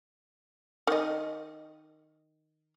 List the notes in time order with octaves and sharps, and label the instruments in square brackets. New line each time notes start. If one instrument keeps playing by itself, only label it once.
[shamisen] D#3 D#5